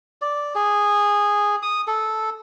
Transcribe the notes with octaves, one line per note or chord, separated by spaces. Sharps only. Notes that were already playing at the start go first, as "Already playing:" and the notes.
D5
G#4
D#6
A4